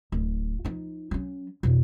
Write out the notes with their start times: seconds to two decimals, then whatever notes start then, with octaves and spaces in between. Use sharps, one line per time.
0.12 D1
0.65 F3 D#4
1.11 F#3 C#4
1.63 F2 B2